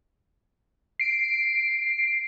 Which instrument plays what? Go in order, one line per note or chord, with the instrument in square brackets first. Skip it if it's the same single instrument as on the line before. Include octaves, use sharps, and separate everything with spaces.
[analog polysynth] C7 D7